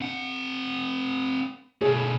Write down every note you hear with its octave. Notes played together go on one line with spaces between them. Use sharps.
C4 F#5
B2 A3 G#4